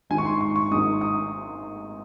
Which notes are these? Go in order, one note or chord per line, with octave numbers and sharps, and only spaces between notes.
G#1 G#2 D#3 G#3 G#5
C#6
C6
C#6
C#6
G#1 G#2 D#3 G#3 D#6
D#6